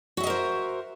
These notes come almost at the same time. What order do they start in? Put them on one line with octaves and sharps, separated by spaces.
F#4 E5 D#5 A#4 C5